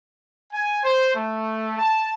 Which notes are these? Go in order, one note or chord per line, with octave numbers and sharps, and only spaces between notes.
G#5
C5
A3
A5